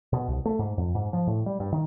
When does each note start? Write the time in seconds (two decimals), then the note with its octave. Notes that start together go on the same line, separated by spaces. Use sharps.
0.13 B2
0.28 C2
0.45 A3
0.59 G#2
0.78 F2
0.95 G#2
1.13 F3
1.27 A2
1.46 G3
1.60 G2
1.72 D#3